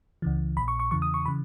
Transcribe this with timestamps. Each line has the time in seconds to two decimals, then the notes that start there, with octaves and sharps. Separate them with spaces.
0.22 C#2 C#3 E3
0.56 A#1 A#2 B5
0.68 C#6
0.80 C#6
0.91 E2 C#3 E3 C#6
1.02 D#6
1.14 C#6
1.25 C#3 E3 B5